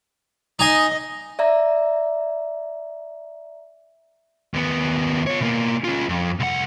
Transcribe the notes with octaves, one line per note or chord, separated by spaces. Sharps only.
D#4 D#5 G#5 C6
D5 E5 A#5
D#2 B3
F4 C#5
B2 A#3
C#4 F4
F2
C2 F#5